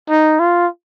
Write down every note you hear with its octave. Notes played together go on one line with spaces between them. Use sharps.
D#4
F4